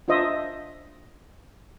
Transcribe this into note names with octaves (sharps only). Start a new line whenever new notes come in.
D4 F4 C5 D#5 E5